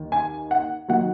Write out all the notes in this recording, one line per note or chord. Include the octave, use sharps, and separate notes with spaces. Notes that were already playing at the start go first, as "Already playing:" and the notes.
Already playing: D#2 D#3
G#5
F#5
D#3 F#3 F#5